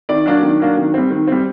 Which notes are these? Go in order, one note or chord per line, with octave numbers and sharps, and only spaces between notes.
D#3 D5
F#3 A#3 D4
D#3
F#3 A#3 D4
D#3
G3 C4
D#3
G3 C4